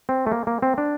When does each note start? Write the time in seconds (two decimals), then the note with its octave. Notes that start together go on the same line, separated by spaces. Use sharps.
0.09 C4
0.27 A3
0.32 A#3
0.47 A#3
0.62 C4
0.78 D4